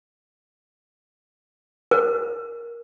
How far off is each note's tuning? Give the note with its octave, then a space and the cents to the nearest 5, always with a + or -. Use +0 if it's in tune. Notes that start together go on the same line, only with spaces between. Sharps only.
A#4 +10